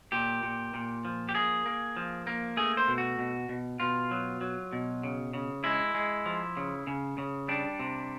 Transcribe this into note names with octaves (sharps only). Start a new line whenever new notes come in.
A#2 G4
A#2
A#2
F3
G4
A#3 G#4
A#3
F3
A#3
A3 G#4
C5
B2
F#4
B2
B2
B2 F4
F#3
F#3
B2
C#3
C#3
G#3 E4
G#3
F3
C#3
C#3
C#3
G3 D4
C3